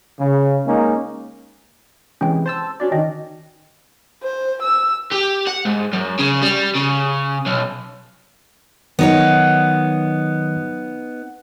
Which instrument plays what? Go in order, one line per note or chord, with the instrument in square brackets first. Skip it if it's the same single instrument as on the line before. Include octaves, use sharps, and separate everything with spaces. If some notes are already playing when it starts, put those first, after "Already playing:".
[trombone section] C#3
G#3 A#3 C#4 D#4
[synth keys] C3 E3 G#3 [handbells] C#4 G5
[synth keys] C5 A5 E6
[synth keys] C#4 D4 D5 [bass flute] F#4
[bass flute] D#3 [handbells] D#5 G5
[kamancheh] C5
E6
[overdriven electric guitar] G4
F#5
G#2
F#2
C#3
G3
C#3
B1
[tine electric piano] D#3 F#3 [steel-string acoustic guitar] B3 D#4 C#5